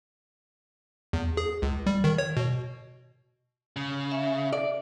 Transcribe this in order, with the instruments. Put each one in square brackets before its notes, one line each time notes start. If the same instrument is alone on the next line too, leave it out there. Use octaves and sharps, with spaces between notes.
[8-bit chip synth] E2
G#4
C#2
G3
D#3
C#5
B2
[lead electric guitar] C#3
[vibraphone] E5
[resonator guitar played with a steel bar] D5